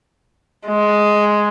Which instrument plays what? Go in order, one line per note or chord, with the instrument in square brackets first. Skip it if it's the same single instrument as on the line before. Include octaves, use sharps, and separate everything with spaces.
[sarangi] G#3